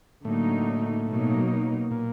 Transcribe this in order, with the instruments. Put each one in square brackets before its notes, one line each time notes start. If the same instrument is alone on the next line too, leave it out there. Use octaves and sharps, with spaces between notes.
[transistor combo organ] A2 A3 [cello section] D3 F#3 A#3 D#4
[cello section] B2 F#3 A#3 D#4
[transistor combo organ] A#2 A#3